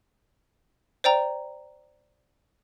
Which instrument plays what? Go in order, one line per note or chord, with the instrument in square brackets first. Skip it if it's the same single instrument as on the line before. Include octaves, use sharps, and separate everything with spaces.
[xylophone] C5 D5 G5 A#5